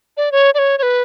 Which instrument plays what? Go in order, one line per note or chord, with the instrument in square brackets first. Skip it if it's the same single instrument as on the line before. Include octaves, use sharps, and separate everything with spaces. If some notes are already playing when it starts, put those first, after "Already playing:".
[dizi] D5
C#5
D5
C#5
C#5
B4